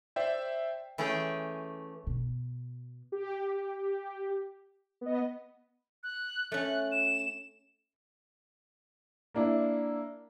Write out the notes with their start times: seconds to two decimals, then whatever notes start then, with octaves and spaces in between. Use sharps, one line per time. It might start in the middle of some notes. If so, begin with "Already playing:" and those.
0.16 C5 D5 E5 G5
0.98 E3 A3 C#4 G#4 G5
2.07 B2
3.12 G4
5.01 B3 D#5
6.03 F#6
6.52 A3 C#4 F#6
6.92 E7
9.34 A#3 D4 E4